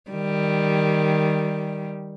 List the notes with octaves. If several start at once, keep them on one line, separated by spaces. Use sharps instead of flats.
D#3 G3